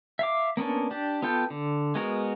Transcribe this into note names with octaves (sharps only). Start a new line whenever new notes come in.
E5 F5 D6
A#3 B3 C#4 D4
D4 G4
B3 F4 A4 G5
D3
G#3 B3 F#4 A#4